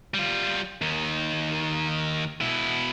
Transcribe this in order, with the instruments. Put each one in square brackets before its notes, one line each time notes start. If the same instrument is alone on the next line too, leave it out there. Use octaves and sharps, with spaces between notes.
[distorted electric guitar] G3 F4
D#2 D#3
B2 E4